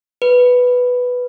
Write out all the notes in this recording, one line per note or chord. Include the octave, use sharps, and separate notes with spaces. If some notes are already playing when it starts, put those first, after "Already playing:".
B4